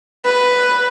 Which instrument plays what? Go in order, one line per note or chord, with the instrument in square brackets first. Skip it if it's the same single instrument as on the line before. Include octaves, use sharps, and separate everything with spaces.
[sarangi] B4